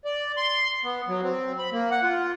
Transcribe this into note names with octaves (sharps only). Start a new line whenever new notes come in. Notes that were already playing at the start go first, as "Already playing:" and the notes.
D5
C6
B3
F#3
C4
B5
A#3
F#5
F4